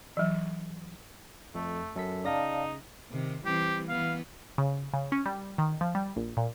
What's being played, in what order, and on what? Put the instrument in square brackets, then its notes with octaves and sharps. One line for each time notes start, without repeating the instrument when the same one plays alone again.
[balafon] E3 F#3
[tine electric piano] F2 [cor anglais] A3
[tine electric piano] F#2 A4 B6
[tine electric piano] C#3 A#6 [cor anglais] D#4 [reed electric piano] D5 F5 A5
[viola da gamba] C3 D#3
[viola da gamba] E3 G3 C4 [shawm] G4
[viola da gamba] E3 B3 [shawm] F5
[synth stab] C#3
C#3
C#4
G3
D#3
F3
G3
A#1
A#2